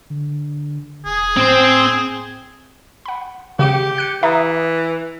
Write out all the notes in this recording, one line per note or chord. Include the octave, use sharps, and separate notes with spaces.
D3
E1 G#4
A2 C4 C5
F#5 B5
C#3 G4 D6 C#7
F#6 C#7
E3 E5 A#5 D#6